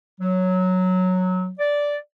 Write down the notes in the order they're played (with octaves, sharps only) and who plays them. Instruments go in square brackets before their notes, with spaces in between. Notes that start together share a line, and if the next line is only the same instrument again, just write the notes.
[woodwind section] F#3
D5